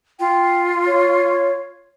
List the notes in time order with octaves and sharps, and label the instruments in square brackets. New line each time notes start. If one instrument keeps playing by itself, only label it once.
[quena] F4 [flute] G5
[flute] C#5